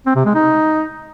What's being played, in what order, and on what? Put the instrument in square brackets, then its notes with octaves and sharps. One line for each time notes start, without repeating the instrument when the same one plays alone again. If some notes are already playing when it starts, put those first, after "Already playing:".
[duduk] C4
C3
G#3
D#4